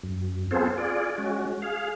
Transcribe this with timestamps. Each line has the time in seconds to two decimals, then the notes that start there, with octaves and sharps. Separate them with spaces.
0.03 F#2
0.51 B3 C4 F4 G#4 A4 C5
0.78 F4 G#4 D5
1.18 G#3 C#4 F#4
1.62 G#4 F5